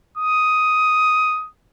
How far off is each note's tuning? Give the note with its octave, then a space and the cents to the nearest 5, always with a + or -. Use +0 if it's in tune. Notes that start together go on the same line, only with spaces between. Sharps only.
D#6 +10